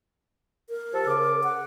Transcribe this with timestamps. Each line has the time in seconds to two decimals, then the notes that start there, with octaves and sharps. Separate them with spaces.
0.69 A#4
0.93 F3 G4 A4
1.07 C#3 D6
1.44 F#5